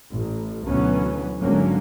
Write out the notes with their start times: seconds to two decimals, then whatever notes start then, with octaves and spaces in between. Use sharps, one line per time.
0.11 A1
0.67 D2 B2 E3 F#3 B3 C#4
1.41 G#1 D3 F#3 G#3 A#3 C#4